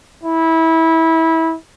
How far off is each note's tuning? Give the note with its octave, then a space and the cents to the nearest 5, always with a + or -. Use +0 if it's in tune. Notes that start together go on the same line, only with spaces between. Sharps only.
E4 -20